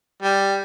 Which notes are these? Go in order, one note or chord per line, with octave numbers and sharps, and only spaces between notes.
G3